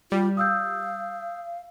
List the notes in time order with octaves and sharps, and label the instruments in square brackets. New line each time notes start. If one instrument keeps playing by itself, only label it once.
[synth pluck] G3 [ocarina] F4
[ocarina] F5 [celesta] D#6 E6 G6